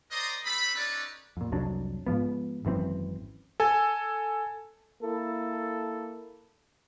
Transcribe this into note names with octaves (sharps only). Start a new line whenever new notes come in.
A#4 C5 D5 D#5 A#5 D#6
A3 C4 A4 B5
C#4 D#4 A4 B4 D5
F2 A#2
C2 F2 F#3 D4
G#2 F3 B3
G#1 F#2 E3 C4
A4 G#5
A#3 E4 A4